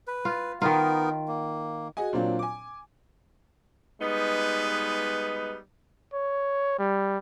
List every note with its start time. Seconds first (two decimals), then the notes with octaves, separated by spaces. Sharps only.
0.07 B4
0.25 F4
0.62 D#3 B3 D#4 F4 A#4
1.28 A#3
1.97 F#4 G#4 D#5 G#5
2.13 A#2 F#3 C4 D4 F4
2.39 G#5 D6
4.01 G3 G#3 B3 D#4 B4
6.14 C#5
6.79 G3